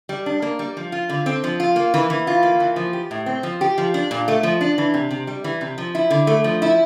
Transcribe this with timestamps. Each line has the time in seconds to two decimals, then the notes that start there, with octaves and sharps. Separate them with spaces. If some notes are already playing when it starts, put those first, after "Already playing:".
0.09 G3
0.26 D4
0.42 A#3
0.59 G3
0.77 F3
0.92 F4
1.09 D3
1.26 C4
1.44 F3
1.60 F4
1.76 A#3
1.94 E3
2.10 E3
2.27 F4
2.43 A#3
2.60 E3
2.76 F3
2.93 G4
3.11 A2
3.26 C4
3.43 F3
3.61 G4
3.78 F3
3.94 D4
4.11 A#2
4.28 A3
4.43 F3
4.61 D4
4.78 E3
4.94 C3
5.11 C3
5.27 G3
5.44 E3
5.61 C3
5.78 F3
5.95 E4
6.10 D3
6.27 A3
6.44 F3
6.62 E4